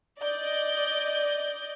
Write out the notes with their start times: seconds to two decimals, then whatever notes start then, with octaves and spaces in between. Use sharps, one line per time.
0.19 D5 D#5 G6